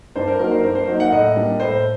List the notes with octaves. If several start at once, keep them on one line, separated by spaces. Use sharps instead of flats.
G2 C5
A#4
F#3 A#3 D#4 A#4
C5
G2 A#4
C5
F#3 A#3 D#4
F#5
A2 D#5
G3 A#3 D4
A2 C5